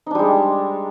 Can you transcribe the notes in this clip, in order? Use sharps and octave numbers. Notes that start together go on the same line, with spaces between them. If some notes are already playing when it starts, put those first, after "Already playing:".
G3 G#3 D4 D#4